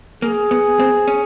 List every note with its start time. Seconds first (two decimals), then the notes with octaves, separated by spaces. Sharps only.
0.22 A#3 G#4
0.51 B3
0.80 C4
1.08 C#4